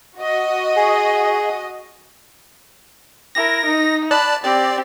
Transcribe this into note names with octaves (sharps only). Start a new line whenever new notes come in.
F#4 D#5
G#4
E4 A#4 A#6
D#4
D5 A5 B5 F#6
C4 G4 D5